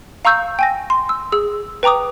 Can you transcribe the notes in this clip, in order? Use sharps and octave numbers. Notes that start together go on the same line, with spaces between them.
F5 A#5 C#6 E6 G6
G5 G#5 A#6
C6
E6
G#4 E6
B4 G5 A#5 D6 D#6